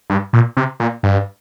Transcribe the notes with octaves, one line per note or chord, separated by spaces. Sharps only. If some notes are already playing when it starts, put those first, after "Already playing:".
G2
A#2
C3
A#2
G2